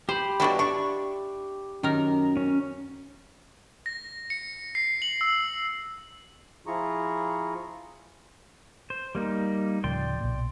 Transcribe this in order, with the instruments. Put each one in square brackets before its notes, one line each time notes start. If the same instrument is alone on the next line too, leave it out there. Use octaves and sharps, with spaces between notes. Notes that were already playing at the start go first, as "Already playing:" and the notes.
[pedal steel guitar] G4 B5 [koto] C5
[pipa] B2 F#3 G3 [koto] D4 E4
[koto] D4 [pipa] C#6
[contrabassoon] F#2 [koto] D#3 A#4
[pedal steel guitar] C#4
[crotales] A#6
C#7
C7
F#7
E6
[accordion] F3 E4 F4 G#4 A#5 C#6
[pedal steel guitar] C5
G3 A#3 D#4
[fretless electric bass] D1 C#3 F3 [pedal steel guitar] D5 G5 C6
[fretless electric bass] B1 A#2